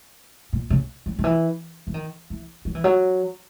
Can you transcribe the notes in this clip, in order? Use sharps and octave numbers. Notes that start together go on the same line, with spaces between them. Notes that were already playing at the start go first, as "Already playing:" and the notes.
A#2
C#3
F#3
D#3
E3
E3
D#3
E3
F#3
E3
F#3